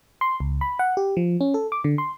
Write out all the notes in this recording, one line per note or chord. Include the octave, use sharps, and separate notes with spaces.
C6
C#2
B5
F#5
G4
F3
C#4
A4
D6
D3
C6